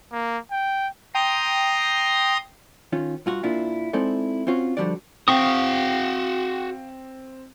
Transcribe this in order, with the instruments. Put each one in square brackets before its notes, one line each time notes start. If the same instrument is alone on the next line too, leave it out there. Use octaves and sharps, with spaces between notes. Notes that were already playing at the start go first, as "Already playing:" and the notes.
[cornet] A#3
G5
[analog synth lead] G5 [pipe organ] A#5 C6 D#6
[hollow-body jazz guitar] D#3 C#4 F4
G2 F4 F#4
A#2 A#3 D4 E4 F4
G#3 C4 D#4 E4 A4 D5
C4 C#4 F4 F#4
D3 F3 G3 F4 F#4 D5
[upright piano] C4 [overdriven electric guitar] F#4 G5 [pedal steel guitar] F5 C#6 D#6